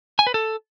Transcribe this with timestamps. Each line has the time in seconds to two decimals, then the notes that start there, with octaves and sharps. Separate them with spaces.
0.19 G#5
0.27 B4
0.34 A4